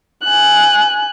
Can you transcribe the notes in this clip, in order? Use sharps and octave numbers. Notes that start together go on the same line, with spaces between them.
G#5 F#6